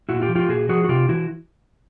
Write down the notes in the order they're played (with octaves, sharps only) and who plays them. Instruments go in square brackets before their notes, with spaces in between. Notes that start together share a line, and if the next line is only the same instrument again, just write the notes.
[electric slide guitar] A#2 E4 F#4
F4 G4
F3
F4 G4
A#2 F#4 G#4
F3 F#4 G#4
F#4
C3 F4 G4
E3 E4 F#4